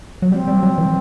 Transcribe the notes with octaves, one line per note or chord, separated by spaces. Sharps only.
F#3
G3 C4
G3
F#3
E3